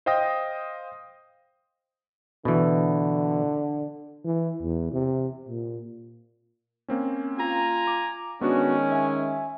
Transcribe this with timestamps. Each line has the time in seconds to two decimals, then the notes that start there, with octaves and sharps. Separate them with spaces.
0.06 C5 D#5 F5 G5 D#6 A#6
2.45 B2 D3 E3
4.24 E3
4.61 E2
4.92 C3
5.49 A#2
6.88 A#3 C4 C#4
7.39 F4 G#5 A#5
7.87 D6
8.41 D#3 G#3 B3 C#4 D4 F#4
8.92 E5 G#5